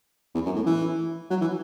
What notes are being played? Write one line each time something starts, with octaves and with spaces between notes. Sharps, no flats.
E2
F#2
A2
E3
F#3
E3